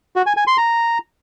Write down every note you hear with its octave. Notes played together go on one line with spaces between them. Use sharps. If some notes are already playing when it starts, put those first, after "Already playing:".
F#4
G#5
G#5
C6
A#5